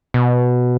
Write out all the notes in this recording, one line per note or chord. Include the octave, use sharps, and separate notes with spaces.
B2